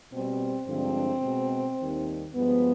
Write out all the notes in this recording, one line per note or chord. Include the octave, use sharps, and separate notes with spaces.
B2 G3 C4
G2 D3 F3 G#3 C4
B2 G#3
D#2 D#3 G3
G2 F3 G#3 B3